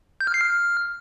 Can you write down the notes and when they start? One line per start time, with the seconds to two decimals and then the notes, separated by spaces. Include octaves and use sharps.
0.21 G6
0.27 F6
0.34 C7
0.41 F6